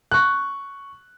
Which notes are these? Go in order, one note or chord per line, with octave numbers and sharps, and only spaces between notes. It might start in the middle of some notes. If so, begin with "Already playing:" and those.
C#6 F#6